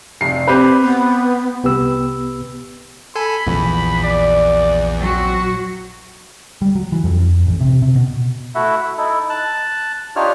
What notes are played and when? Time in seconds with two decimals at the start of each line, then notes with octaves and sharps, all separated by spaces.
0.21 F1 C7
0.48 C4 G4 B4
0.82 B3
1.64 C2 B3 G4 B4 E6
3.16 A4 G#5 B5
3.47 A#1 E2 E3 F3
4.03 D5
4.99 F#3 C4 F#4
6.62 G3
6.75 F#3
6.92 E3
7.04 F2
7.19 F2
7.47 A1
7.60 C3
7.82 C3
7.96 B2
8.55 A3 E4 F#4 E5 F#5
8.81 E5
8.98 D#4 E4 A4
9.30 A5 F#6
10.16 D4 D#4 F4 G4 C#5 F6